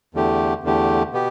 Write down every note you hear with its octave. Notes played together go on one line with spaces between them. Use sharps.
E2 D3 A3 G4
E2 D3 A3 G4
B2 B3 G4